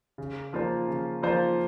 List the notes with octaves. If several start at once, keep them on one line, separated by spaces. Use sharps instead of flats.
C#3
F3 A#3 F4 C5
C#3
F3 A#3 F4 C5